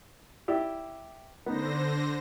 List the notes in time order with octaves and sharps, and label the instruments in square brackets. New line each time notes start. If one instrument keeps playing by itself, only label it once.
[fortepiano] E4 G4 D5
[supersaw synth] D3 C5 A#6 [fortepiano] B3 D#4